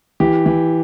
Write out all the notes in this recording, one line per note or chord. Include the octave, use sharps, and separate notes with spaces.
E3 G4
E3